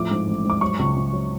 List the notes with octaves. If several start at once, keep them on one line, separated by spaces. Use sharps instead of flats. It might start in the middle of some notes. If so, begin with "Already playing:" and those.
Already playing: A2 F3 D6
G#2
A1
G#2
D6
F#3 C#6
C#2
C#2
F#3